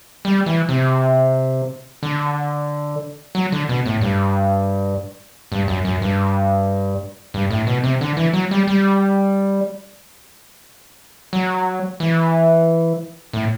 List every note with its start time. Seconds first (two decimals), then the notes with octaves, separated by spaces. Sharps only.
0.25 G3
0.46 E3
0.69 C3
2.03 D3
3.35 F#3
3.52 D3
3.69 B2
3.86 A2
4.01 G2
5.52 G2
5.68 F#2
5.85 F#2
6.02 G2
7.34 G2
7.51 A2
7.67 B2
7.84 C3
8.01 D3
8.17 E3
8.33 F#3
8.51 G3
8.68 G3
11.33 F#3
12.00 E3
13.33 A2